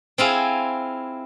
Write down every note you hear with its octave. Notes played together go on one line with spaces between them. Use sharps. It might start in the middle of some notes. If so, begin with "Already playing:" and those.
C4 E4 F4 G#4